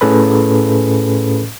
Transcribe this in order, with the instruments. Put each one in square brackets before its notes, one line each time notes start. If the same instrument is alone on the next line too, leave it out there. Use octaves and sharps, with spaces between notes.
[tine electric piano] A2 C#4 G#4 A4 B4 B5